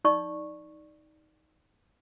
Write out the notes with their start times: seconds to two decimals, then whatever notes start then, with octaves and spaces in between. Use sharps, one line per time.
0.05 D#4 D5 C#6